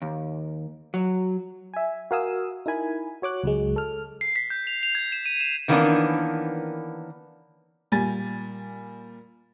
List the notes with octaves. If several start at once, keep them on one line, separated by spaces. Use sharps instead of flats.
D#2
F#3
E5 G#5
F#4 A#4 F5 G#5 D#6 E6
D#4 E4 A#4 G#5 B5
F#4 C#5 D6 F#6
C#2 F#3 G#3
A4 F6
C7
B6
G6
F7
F7
G#6
E7
D#7
E7
D#3 E3 A#3 B3 C#4 D4
A#2 G3 G#5 A6